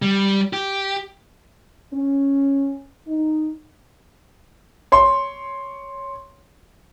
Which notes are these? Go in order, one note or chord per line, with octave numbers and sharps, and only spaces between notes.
G3
G4
C#4
D#4
C#5 C6